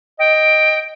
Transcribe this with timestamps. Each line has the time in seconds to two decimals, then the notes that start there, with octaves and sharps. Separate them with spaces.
0.19 D#5 G5